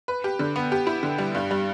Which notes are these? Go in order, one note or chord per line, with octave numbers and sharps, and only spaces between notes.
B4
G4
D3
B3
G4
E4
D3
G3
G2
G3